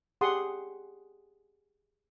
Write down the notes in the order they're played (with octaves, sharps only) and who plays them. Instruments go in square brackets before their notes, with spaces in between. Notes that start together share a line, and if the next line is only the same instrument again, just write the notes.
[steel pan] G4 G#4 F#5 C6 D#6